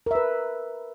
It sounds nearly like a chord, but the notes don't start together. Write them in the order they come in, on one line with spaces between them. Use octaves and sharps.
A#4 E5 B4